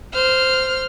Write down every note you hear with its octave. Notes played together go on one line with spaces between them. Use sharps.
C5 F6